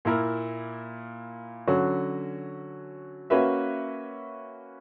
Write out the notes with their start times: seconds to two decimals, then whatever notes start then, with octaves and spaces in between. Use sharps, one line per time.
0.05 A#2 A#3 E4 A#4
1.67 D3 F#3 C#4 F#4
3.30 A#3 C#4 F#4 B4 E5